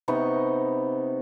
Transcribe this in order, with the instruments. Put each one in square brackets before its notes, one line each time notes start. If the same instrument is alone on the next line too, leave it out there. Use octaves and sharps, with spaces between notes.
[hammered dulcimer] C3 B3 D#4 C#6